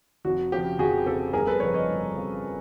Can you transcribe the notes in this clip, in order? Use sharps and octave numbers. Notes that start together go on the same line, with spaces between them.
F1 F#4
F2 C#3 F3 G4
F1 F#4 G#4
F2 C#3 F3 G4 A4
G1 G#4 A#4
A4 B4
F2 C#3 F3 B4 C#5
C#5 D#5
G1
F2 C#3 F3